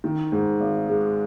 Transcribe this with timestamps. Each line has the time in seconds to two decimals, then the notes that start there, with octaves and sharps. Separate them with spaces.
0.04 D#3
0.32 G#2
0.60 G#1
0.89 G#3